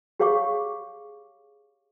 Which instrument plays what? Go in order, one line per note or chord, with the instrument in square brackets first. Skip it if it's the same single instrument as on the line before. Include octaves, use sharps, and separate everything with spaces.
[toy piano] G4 G#4 C#5 F5 C#6 D6